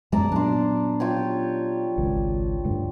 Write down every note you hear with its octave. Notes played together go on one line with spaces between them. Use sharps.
F#2 G#3 B3 D5 A5 A#5
A#2 F#3 B3 D4 C6
F4 G4 C#5
G#1 C#2
D2 G2 D3